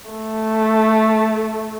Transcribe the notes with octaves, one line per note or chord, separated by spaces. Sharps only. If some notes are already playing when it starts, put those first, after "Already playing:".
A3